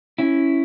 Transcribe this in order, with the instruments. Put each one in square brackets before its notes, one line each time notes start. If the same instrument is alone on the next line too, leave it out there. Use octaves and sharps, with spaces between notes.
[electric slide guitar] C#4 E4